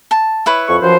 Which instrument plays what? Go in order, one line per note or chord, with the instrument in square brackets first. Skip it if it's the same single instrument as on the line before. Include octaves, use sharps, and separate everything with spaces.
[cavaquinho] A5
E4 B4 C#5
[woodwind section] F2 C#6
F#2 F3 C5